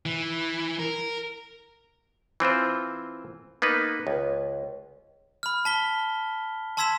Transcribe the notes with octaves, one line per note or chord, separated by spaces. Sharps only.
E3
A#4
E3 C4 F4 C5
A#3 B3 D#4 B4
C#2
B5 F6
A5 B6 G7
A5 C6 E6 G#6 B6 E7